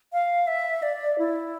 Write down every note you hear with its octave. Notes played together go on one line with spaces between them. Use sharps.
F5
E5
D5
E4